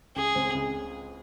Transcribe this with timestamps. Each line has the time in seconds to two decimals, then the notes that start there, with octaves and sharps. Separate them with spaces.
0.16 C#2 G#4
0.35 C#3 G#3 C4
0.55 C#2